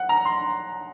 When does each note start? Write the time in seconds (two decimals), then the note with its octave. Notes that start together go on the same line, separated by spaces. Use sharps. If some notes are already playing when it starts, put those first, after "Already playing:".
Already playing: F#5
0.09 A#5
0.25 C6